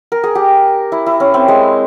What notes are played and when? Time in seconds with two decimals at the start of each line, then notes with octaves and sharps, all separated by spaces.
0.12 A#4
0.24 G#4
0.35 G4
0.92 E4
1.06 E4
1.20 C#4
1.34 C4
1.48 G#3